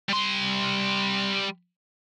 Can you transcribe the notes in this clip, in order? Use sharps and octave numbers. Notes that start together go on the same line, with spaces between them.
G3 C6